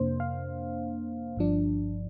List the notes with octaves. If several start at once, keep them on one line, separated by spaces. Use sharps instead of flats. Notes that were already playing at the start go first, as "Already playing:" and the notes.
Already playing: F2 C3 A#3 D4 C5
F5
G1 G2 F3 D4